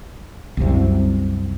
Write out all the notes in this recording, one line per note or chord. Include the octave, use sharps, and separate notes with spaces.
C2 F#2 C3